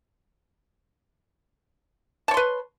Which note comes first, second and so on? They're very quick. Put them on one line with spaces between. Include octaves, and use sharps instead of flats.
A5 C#5 C6 B4